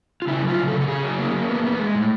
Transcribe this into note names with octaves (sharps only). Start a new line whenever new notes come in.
F4
C#3 E4
F#3
F4
C#3
A4
C#3
A4
C#3 G#4
F#3
A#3
A#3
B3
B3
G#3
A2